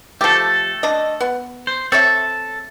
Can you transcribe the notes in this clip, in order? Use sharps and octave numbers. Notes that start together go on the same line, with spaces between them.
F3 A3 G4 A4
D4 D#5
B3
C5
C4 A4 C#5 E5